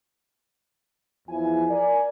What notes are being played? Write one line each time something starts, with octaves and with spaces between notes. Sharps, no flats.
E2 F3 E4 G#5
A#4 D5 G#5